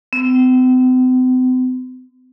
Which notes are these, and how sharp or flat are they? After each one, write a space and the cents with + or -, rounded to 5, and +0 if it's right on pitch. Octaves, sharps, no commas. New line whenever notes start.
C4 -45